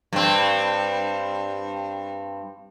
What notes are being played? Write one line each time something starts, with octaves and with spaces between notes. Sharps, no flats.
G2 C4